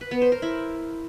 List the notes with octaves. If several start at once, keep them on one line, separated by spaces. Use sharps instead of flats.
B4
B3
C5
A#4
E4